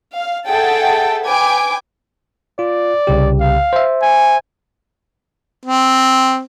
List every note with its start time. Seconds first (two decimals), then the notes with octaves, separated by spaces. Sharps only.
0.15 F5
0.47 G#4 A4 E5 F#5 G5 A5
1.24 B4 G5 G#5 D6
2.59 F4 D5
3.07 C2 C#3 G4
3.41 F5
3.73 C5 E5
4.02 G#5
5.66 C4